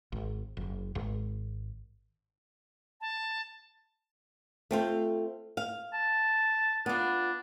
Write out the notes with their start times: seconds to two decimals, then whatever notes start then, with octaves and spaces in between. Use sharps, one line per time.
0.12 G#1
0.57 F#1
0.95 G#1
3.01 A5
4.71 A3 C4 F4
5.57 F5
5.93 A5
6.86 B3 D4 F4